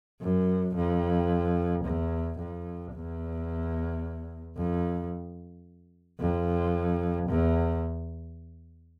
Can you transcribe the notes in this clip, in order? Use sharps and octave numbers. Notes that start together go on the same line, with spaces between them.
F#2
F2
E2
F2
E2
F2
F2
E2